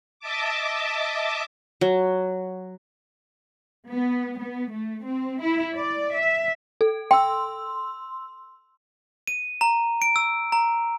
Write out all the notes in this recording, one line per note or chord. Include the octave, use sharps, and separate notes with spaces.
D#5 E5 A5 D6
F#3
B3
B3
A3
C4
E4
D5
E5
A4
G5 C6 E6
D#7
A#5
D7
E6
A#5